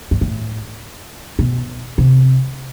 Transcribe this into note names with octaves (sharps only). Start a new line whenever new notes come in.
G2
A2
B2
C3